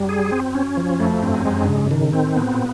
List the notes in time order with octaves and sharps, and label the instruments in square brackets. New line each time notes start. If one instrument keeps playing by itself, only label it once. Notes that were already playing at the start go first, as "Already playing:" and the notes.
Already playing: [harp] F#2 [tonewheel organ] G3
[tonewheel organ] G#4
C4
C#4
F3
[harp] F2 [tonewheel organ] A3
[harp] G2 [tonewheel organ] C4
[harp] F#2
[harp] F#2 [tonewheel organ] G#3
[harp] G2
[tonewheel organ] C#3
[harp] G#2
[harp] A2 [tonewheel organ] D#3
[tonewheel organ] C4
[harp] A2 [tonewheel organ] B3
[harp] A#2